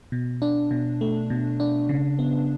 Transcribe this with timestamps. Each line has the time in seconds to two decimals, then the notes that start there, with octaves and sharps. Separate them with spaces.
0.12 B2
0.42 D4
0.71 B2
1.01 A3
1.30 B2
1.60 D4
1.89 C#3
2.19 B3